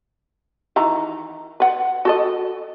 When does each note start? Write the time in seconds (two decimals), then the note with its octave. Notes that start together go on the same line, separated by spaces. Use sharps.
0.76 D#3 E3 A#5
1.60 B4 F#5
2.05 F#4 A4 D#5